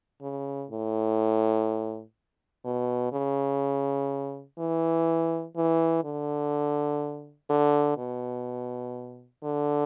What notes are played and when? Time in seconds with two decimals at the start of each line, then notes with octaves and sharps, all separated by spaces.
0.22 C#3
0.71 A2
2.65 B2
3.12 C#3
4.58 E3
5.56 E3
6.04 D3
7.49 D3
7.97 B2
9.43 D3